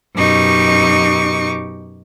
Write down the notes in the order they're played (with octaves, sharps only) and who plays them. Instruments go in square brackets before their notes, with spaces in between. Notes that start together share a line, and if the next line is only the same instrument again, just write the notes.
[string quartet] F#2 B2 D#4 G4 C#6 D6